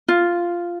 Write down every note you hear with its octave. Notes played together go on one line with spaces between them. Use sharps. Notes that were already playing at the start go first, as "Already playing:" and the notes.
F4